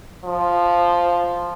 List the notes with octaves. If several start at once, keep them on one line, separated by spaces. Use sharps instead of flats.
F3